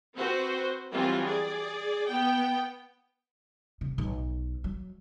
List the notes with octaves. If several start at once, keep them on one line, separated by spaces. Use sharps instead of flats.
C4 F#4 B4 C5
E3 F#3 G3 C4 F4
G#4 D5
B3 G5
C3
B1
F#3